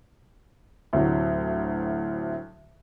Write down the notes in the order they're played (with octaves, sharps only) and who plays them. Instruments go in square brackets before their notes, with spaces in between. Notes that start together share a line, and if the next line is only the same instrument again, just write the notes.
[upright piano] D2 A2 C3 F#3